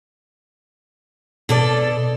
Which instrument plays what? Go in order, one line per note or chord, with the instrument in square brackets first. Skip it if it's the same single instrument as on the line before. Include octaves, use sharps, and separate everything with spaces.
[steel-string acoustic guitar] B2 A4 D5